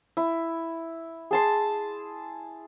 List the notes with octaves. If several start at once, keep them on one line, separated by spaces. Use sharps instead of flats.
E4
G#4 A5 C6